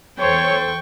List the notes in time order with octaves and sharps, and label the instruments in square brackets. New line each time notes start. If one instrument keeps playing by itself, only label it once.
[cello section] E2 A4 C5 [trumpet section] C#5 [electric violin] G5 C#6